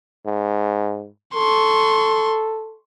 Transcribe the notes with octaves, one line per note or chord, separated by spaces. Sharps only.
G#2
A4 C6 C#6